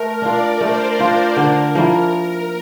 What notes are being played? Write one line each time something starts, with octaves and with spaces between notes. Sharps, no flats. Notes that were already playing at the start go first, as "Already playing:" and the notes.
Already playing: A3 A#4
D4 F4 D5
A3 C5
D4 F4
D3 A#4
F3 A#3 E4